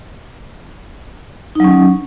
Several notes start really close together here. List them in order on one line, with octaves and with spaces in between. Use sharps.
D#4 F#3 C#4